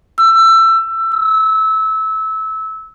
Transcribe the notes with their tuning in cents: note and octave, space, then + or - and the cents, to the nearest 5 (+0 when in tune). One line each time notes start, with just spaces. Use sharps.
E6 +20
E6 -20